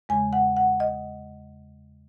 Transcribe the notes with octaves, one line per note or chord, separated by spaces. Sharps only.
E2 C#3 G#3 G#5
F#5
F#5
D#5